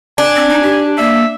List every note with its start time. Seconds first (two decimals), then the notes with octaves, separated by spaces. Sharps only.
0.18 D4 G#5
0.36 C4
0.49 D#4
0.62 G4
0.98 A#3 E5